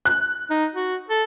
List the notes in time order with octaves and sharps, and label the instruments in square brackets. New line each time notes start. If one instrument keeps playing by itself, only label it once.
[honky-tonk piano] F#6
[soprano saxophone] D#4
F#4
A4